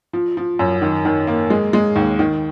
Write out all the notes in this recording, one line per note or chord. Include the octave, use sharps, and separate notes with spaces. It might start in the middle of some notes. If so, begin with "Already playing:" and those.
F3
F3
F#2
D#3
D#3
A#3
G#3
G#3
D#2
D#3